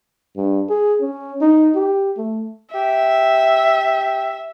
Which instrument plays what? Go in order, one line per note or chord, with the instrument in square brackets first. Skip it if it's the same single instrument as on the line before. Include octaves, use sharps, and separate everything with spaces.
[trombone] G2
G#4
C#4
D#4
G4
A3
[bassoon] G4 [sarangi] E5